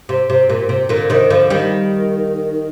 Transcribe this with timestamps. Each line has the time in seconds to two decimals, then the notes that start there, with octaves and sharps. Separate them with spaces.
0.09 C3
0.30 C3
0.50 A#2
0.69 C3
0.89 A#2 D3
1.10 C3 D#3
1.30 D3 F3
1.50 D#3 G3